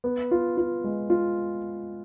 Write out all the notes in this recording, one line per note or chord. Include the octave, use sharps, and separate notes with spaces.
B3
F4
F4
G#3
F4